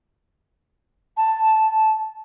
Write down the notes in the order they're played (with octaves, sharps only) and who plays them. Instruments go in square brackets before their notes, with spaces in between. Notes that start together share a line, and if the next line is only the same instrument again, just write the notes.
[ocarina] A5